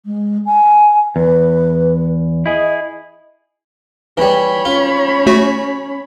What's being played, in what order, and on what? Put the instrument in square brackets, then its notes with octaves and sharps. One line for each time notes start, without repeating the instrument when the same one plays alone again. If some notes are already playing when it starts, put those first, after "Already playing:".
[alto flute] G#3
G#5
[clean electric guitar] E2 [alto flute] B4
[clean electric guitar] E4 G#4 [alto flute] D#5
[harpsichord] E3 G3 [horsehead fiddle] C#5 B5
[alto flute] C#4 [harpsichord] F4
[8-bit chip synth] A3 F#4 B6